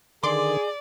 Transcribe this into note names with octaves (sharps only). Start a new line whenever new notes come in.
D3 D#3 G#4 D5 C6 D6